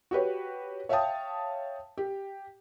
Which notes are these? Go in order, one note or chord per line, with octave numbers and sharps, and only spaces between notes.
F#4 G4 B4 C#5
C#5 E5 F5 G5 A5 D#6
G4